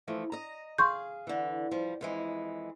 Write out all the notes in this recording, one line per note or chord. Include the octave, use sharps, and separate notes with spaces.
E3 F3 A3
D#5 A#5
G#4 F5 C6 C#6 G6
D3 E3
F3 G3
F2 E3 G#3